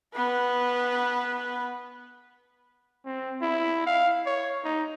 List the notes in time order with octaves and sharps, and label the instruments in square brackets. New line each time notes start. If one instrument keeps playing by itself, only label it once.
[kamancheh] B3 B4
[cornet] C4
E4
F5
C#5
D#4